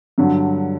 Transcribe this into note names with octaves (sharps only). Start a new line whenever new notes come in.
G2 D3 F#3